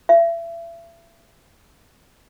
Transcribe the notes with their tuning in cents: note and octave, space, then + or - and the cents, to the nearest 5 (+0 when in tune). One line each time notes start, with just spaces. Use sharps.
E5 +35